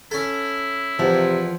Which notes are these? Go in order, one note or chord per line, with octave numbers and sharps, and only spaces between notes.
C#4 E4 A4
E2 C3 F3